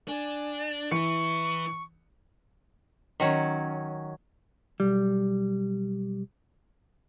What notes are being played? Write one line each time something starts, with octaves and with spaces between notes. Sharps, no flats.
D4 G#5
E3 E4 B4 C#6 C#7
D#3 F#3 C#4
B1 G3